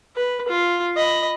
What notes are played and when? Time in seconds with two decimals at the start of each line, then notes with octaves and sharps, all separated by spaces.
0.16 B4
0.48 F4
0.96 D#5 B5